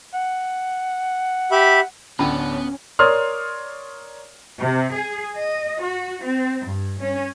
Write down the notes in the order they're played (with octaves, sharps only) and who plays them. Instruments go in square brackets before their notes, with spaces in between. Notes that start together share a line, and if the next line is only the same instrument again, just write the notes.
[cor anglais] F#5
[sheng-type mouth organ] G4 E5 B5
[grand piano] D1 D3 [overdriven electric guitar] B3 [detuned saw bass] C#4 [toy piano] D4 G5 B5
[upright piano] A#4 C#5 D5 C6 D#6 F6
[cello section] C3
G#4
D#5
F#4
C4
G2
C#4